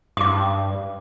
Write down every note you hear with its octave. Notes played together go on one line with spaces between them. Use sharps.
G2 D6 D#6